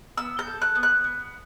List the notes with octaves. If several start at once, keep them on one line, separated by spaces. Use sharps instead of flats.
B3 E6
G6
A4
F#6
B3
F#6
B3